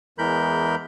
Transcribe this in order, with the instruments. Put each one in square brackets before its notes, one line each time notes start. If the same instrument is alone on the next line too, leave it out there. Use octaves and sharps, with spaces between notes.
[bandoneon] E2 E3 G#3 A#4 B5 G6